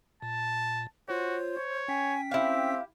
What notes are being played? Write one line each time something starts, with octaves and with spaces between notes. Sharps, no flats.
A#2 A5
F4 F#4 C5 C#5
C#5
C#4 G5 G#5 B6
C4 E4 G4 F5